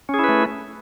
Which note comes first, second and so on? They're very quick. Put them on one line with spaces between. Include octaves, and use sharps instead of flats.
C#4 G#4 E4 B4 A3